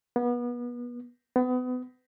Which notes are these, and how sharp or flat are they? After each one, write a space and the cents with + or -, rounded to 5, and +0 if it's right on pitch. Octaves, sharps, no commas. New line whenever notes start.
B3 -30
B3 +30